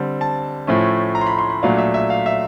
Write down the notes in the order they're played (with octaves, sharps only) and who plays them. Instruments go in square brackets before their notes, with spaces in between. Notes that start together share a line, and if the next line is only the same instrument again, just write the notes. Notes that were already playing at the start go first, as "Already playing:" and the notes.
Already playing: [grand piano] D3 G3 C4
A5
A2 F3 A3 C#4
A#5
C6
B5
C6
B5
A#2 F#3 A3 D4 F5
E5
E5
F5
E5